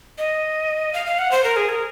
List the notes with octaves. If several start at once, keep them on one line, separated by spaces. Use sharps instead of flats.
D#5
F5
F5
F#5
C5
A#4
G#4
A#4